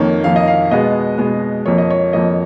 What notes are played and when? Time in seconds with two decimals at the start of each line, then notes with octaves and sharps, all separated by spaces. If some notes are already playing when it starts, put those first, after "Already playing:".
Already playing: F2 D#3 A#3 C#5
0.24 F2 D#3 A#3 F5
0.36 D#5
0.48 F5
0.71 B2 G#3 B3 D#5
1.18 B2 G#3 B3
1.66 F2 F3 A#3 C#5
1.78 D#5
1.90 C#5
2.13 F2 F3 A#3 D#5